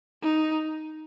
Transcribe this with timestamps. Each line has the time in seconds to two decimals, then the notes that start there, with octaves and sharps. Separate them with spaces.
0.22 D#4